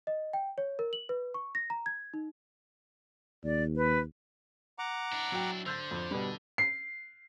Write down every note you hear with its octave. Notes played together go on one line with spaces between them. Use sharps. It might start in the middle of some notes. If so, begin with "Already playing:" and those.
D#5
G5
C#5
A#4
F#7
B4
C#6
A#6
A#5
G#6
D#4
D#2 D5
B4
F#5 A#5 D6
D4 E4
F#3 G5
D3 C5 E6 G6 A6
F2
B2 G3
C7